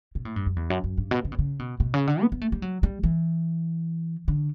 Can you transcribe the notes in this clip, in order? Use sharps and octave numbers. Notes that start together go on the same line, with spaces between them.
B2
A2
G2
F#2
E2
F#2
F#2
G2
B2
C#3
B2
C#3
B2
B2
C#3
D3
B3
B3
A3
G3
F#3
G3
E3
D3